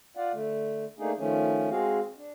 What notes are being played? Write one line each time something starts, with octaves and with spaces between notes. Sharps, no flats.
F4 D5 F5 F#5
D3 A3
A3 A#3 D4 D#4 G#4
D#3 F3 A3 C#4
G#3 C4 F#4 G#4 F5
D4